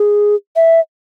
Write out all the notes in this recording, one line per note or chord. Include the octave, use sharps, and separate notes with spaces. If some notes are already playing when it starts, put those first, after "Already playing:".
Already playing: G#4
E5